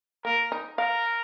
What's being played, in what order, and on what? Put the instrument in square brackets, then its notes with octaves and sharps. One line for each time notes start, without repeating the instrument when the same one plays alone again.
[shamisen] A#3 [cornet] A#4
[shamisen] D#4
[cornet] A#4 [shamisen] F5